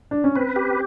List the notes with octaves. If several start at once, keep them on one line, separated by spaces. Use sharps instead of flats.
D4
C#4
C4 B4
G4